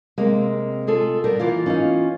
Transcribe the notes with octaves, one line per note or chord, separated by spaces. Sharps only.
C3 G#3 A#3 C4
F4 G#4 A4
G3 B3 A#4
E3 A#3 F4
C#4 D#4 F5